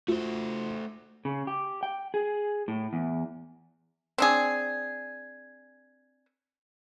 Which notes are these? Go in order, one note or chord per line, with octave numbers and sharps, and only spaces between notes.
A3 F4 F#4 C5
C#3
G4
G5
G#4
A2
E2
C4 D4 G#4